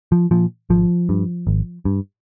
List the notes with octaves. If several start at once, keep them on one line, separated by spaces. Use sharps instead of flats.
F3
A#2 F3
G#1 F3
G2
G#1
G2